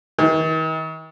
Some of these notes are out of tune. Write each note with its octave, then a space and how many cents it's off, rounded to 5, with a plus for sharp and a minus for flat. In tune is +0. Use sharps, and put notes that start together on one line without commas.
D#3 +40